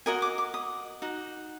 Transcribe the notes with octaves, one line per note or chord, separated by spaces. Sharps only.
F#4 A#4 D#5 G#5
D6
D6
D#6
D#4 F#4